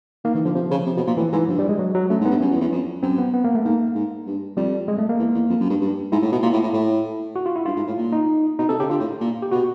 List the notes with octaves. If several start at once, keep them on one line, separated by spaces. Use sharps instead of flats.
D#3 A#3
D#3 E3
D3 F3
C3 F3
C#3
C3
B2
A#2
A2 E3
G#2 E3
G2 F3
G3
G#3
F#3
F#3
F#2 A3
G#2
B3
G2
F#2 C#4
E2
E2
F2
F#2 C4
B3
B3
A#3
A3
G#2 A#3
G#2
G2
F2 G3
G#3
A3
A#3
E2
E2
F2
F#2
G2
G2
G#2 E4
A2
B2
A#2
A2
A2
A2
F#4
F4
E4
G2 F4
G#2
A2
A#2
D#4
B2 D#4
C3 A4
C#3 G4
D3 F4
A2
A#2
G4
B2 F#4